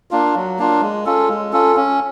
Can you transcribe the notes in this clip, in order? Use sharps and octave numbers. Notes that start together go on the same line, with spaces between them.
A#3 D4 F4
F#3
A#3 D4 F4
G#3
C#4 F4 A4
G#3
C#4 F4 A4
C#4